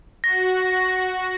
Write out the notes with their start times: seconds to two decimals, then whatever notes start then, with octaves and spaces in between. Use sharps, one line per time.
0.24 F#4 A#6